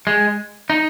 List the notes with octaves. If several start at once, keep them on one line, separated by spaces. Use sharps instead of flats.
G#3
D#4